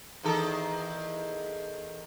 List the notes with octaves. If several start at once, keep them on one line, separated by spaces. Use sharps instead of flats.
E2 D#3 A4